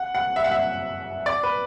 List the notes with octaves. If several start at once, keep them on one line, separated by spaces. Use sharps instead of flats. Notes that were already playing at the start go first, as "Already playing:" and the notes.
Already playing: F#5
F#5
E5
F#5
E5
D5
B4